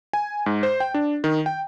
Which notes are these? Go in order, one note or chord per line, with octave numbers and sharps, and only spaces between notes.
G#5
G#2
C5
G5
D4
D#3
G5